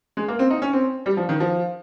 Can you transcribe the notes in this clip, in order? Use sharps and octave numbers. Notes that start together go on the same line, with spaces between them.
G#3
A#3
C4
D#4
C#4
C4
G3
F3
D#3
F3